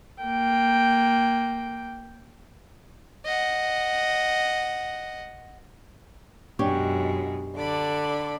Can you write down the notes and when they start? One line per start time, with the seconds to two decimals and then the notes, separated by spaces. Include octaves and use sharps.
0.23 A#3 G5
3.25 D#5 F#5
6.59 F#2 B2 G#3 D4 G4 C#5
7.57 D3 D5 B5 D6